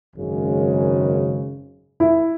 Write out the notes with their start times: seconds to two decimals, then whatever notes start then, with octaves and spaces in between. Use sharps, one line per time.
0.16 G#1 F#2 C#3 G#3
2.00 E4